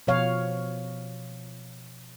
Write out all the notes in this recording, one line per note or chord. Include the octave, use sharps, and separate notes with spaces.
B2 F3 C#5 F5